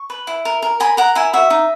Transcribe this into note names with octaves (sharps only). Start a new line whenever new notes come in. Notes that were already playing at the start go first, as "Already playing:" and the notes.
Already playing: C#6
B4
E4
A#4
A#4
A#4 G#5 B5
A#4 F#5 A#5
E4 E5 G#5
F#4 E5
D#4